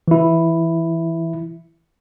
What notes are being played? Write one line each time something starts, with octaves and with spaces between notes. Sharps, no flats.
E3 E4